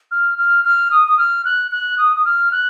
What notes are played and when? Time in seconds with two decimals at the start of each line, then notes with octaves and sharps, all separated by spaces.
0.11 F6
0.38 F6
0.64 F6
0.91 D#6
1.08 D#6
1.18 F6
1.45 F#6
1.71 F#6
1.98 D#6
2.16 D#6
2.25 F6
2.52 F#6